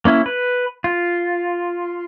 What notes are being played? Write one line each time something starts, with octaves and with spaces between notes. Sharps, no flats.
A#3 C#4 E4
B4
F4